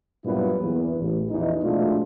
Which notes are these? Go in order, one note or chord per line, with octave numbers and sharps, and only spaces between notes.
G2 A#2 F#3 B3 E4 B4
E2
A1
A#1 E2 E3 D#4
A#1 B2 G#3 A3 D4 F4